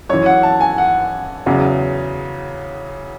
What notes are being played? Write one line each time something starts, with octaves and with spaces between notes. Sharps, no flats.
F#2 E3 C#5
F#5
A5
G#5
F#5
E2 C#3 F#3